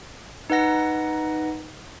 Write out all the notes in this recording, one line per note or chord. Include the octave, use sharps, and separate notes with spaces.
D#4 B4 F#5 A#6